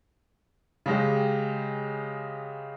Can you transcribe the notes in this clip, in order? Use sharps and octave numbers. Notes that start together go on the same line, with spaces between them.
C#3 G#3 G4